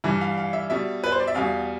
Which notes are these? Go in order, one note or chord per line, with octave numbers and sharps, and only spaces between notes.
G2 E3 G3 E5
F5
F5
E5
B2 G3 E5
B4
C5
D5
E5
E2 B2 G3 F5